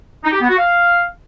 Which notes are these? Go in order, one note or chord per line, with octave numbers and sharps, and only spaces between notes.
D#4
G4
B3
F#4
F5